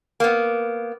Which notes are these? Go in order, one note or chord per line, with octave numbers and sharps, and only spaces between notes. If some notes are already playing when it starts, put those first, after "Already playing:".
A#3 B3